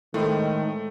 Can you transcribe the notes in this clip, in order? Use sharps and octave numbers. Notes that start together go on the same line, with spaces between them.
A2 D#3 G#3 A3 C4 D#4